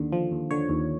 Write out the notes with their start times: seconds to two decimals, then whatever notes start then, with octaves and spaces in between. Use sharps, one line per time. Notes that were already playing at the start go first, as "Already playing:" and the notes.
Already playing: D#2 D3
0.12 F3
0.31 D#2
0.51 D3 C#5
0.69 D#2